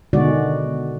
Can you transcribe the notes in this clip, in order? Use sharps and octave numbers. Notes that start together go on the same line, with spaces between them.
B2 D3 D#3 G#3 F#4 D5